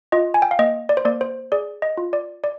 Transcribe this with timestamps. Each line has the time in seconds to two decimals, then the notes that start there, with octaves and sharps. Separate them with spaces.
0.12 F4 D#5
0.34 G#5
0.42 G5
0.51 F5
0.59 A#3 D#5
0.89 D5
0.97 C5
1.05 A#3 D5
1.21 C5
1.52 G#4 D5
1.82 D#5
1.97 F4
2.13 D5
2.44 D5